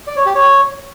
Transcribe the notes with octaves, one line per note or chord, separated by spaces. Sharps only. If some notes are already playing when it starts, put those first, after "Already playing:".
D5
C#5
G4
C#5